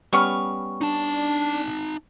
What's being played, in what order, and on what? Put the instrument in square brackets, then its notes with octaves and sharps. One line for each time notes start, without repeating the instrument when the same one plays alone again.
[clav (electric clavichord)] G3 B3 C#4 [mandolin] C#6 F6
[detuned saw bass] D4 [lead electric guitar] D#4 A5